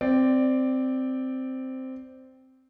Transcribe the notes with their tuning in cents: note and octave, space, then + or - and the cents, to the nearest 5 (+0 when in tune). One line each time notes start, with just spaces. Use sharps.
C4 -5 D5 +0